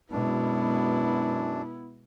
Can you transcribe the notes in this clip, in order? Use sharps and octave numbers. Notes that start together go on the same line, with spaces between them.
F#2 B2 G#3 B3 D4 E4